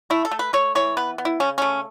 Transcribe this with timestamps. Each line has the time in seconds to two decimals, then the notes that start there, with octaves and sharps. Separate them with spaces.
0.10 A3 E4
0.25 A4
0.31 A3
0.39 B4
0.53 A3 C#5
0.75 E3 C#5
0.97 B3 B4
1.18 B3
1.25 E4
1.40 C#3 C#4
1.58 A3 C#4